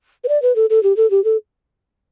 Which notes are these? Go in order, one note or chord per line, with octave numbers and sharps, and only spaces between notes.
B4
D5
B4
A4
A4
G4
A4
G4
A4